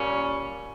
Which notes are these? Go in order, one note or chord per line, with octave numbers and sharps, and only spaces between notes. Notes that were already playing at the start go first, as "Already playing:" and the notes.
Already playing: A#2 G3 C#4